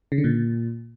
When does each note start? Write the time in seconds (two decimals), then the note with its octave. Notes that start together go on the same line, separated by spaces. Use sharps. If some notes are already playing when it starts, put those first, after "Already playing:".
0.12 C#3
0.18 D3
0.24 A#2